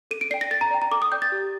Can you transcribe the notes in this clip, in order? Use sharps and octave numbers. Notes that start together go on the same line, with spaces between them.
A4 D#7
D7
D5 G5 C7
A#6
A4 A6
A#5
D5 G5
A#5
A4 D6
D#6
D5 G5 G6
A6
G4